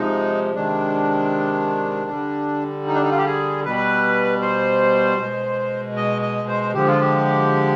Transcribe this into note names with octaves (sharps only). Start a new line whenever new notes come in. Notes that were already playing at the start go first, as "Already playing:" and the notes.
Already playing: C3 F3 G#3 D#4
C3 D#3 G#3 D4
D3 G3
D#4
D4
D#4
F4
G4
G#4
B2 G3 B4
C5
B2 G#3
D#5
D#5
C5
D3 F3 G#3 G4
F4
G4